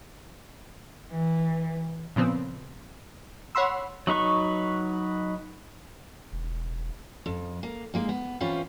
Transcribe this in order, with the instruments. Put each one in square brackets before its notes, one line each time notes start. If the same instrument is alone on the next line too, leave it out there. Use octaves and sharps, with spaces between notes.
[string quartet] E3
[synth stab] A#2 C#3 F3 B3 C4
C#5 F#5 B5 C6 E6
[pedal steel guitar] F#3 D#4 B4 C#6
[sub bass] E1
[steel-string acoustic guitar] F2
A#3
G#3 A#3 D#4
B3
E3 C4 C#4 F4 B4